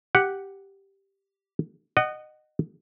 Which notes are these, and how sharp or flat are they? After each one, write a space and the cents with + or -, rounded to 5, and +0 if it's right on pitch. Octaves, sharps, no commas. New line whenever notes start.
G4 -5 F#5 +0
D#5 -20 F#5 +15